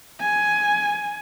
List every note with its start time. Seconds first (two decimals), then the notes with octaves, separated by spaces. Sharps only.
0.20 G#5